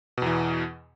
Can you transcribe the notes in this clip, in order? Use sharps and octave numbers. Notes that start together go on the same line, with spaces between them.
E2 B2 E3